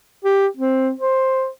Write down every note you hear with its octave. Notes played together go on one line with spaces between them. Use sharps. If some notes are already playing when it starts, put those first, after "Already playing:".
G4
C4
C5